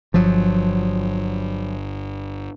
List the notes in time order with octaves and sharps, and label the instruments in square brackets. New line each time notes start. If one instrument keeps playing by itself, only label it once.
[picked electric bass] G1 [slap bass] F3 F#3